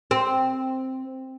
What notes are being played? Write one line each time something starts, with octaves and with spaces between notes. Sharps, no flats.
C4